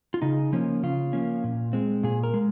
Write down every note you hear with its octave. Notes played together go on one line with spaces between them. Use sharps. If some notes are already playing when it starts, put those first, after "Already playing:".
F4
C#3 D#4
F3 A#3 C#4
C#3 F4
F3 A#3 C#4
A#2
G#3 C4
A#2 G#4
A#4
G#3